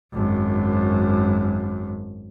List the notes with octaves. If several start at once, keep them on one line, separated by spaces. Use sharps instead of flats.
G#1 F#2